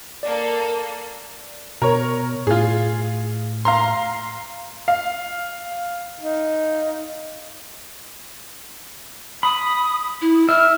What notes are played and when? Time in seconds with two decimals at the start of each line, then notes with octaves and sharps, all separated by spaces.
0.23 A#3 A4 D5
1.82 B2 A#4 C#5
2.47 A2 F4 G#4
3.65 F5 A#5 C6
4.88 F5
6.21 D#4
9.43 B5 D#6
10.21 E4
10.49 E5 F6